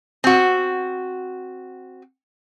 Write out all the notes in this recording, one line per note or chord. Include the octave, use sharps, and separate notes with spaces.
C4 F#4